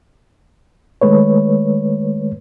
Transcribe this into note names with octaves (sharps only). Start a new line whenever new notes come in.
D#3 G#3 A3 B4 C#5